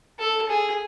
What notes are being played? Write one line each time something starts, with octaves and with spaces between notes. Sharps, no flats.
A4
G#4